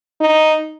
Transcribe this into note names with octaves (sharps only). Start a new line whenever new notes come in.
D#4